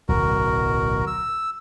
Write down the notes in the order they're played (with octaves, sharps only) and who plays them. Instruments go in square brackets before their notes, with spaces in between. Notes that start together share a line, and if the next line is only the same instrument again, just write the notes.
[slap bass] D1 B1 [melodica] F#4 A#4
[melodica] E6